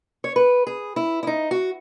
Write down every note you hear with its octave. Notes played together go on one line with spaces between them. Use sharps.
C#5
B4
G#4
E4
E4
D#4
F#4